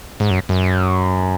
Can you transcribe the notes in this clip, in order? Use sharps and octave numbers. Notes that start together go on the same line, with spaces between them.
G#2
F#2
F#2